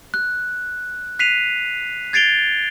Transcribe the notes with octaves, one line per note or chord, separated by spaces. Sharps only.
F#6
F#6 B6 C7 D#7 F7
G#6 A6 C7 D7 F7 G7